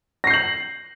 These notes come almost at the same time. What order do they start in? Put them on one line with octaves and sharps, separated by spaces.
A#6 C7 G6 F#7